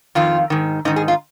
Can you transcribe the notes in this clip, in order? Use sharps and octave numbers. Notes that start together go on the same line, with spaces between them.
F2 D#3 F4
G#2 D#3
G#2 D#3 D#4
G#4
F4